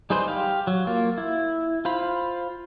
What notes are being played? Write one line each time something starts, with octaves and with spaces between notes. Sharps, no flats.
G3 D#4 G#4 B4 C5
G4 F5
F#3
A#3 F4
E4
F4 C5 F5 B5